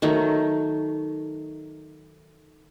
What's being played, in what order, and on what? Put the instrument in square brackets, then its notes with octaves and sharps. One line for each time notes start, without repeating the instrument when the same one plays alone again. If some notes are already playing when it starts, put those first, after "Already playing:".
[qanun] D#3 F#3 A3